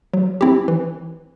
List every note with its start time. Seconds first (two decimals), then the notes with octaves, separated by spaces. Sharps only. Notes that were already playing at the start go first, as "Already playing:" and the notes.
0.14 F#3
0.41 C4 E4 G4
0.68 E3